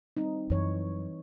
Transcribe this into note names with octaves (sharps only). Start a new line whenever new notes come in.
G3 C4 D#4
F#2 E3 C#5